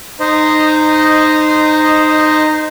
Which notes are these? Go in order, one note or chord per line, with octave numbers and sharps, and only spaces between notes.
D#4 C5 D#5